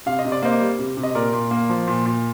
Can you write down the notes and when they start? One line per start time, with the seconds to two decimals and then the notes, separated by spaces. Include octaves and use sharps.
0.06 C3 F5
0.19 D#5
0.25 C3
0.32 D5
0.42 A#3 C5 D#5
0.60 G3
0.79 C3
0.97 C3
1.03 D#5
1.15 A#2 A#4 D5
1.33 A#2
1.51 A#3
1.69 F3
1.88 A#2
2.06 A#2